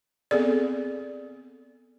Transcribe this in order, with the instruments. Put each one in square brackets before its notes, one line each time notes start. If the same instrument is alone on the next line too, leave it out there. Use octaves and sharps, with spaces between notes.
[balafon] B3 C4 G#4 A4 D5